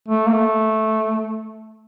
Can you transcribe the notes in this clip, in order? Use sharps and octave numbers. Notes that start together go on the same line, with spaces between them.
A3
A#3
A3